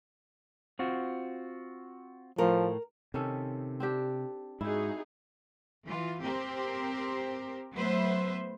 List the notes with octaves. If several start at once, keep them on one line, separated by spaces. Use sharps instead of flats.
C4 F4 F#4
A2 F3 A3 A#4
C3 D#3 C#4 A4
C4 D4 G4
G#2 D#4 E4 F#4 G#4
E3 F4
C4 G4 A#4 C5
F#3 A3 B3 B4 C5 E5